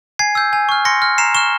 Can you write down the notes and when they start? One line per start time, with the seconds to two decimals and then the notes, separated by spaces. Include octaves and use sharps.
0.19 G#5 G#6 C7
0.35 E6 G6
0.53 G#5
0.69 C#6 F6
0.85 C6 A#6 C#7
1.02 F6
1.18 A#5 C7 E7
1.34 C#6 F6 E7 G7